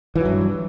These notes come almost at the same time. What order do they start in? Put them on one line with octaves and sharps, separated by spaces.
E3 F#3 G2